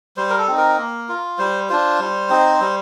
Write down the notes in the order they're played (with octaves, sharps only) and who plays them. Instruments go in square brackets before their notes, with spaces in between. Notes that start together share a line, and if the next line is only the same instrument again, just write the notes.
[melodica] G3 C5
A#4
A4
C4 D#4
A#4
A#3
F4
G3 C5
D4 F4 C5
G3
C4 D#4
G3